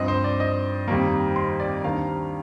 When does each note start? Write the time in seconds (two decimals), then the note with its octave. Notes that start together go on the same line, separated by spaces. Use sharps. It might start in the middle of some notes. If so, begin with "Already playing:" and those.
Already playing: G2 F3 C4 D#5
0.08 C5
0.24 D5
0.40 D#5
0.88 F2 D#3 G3 A#3
1.36 C6
1.60 D5
1.84 D#2 D#3 G3 A#3 D4 F5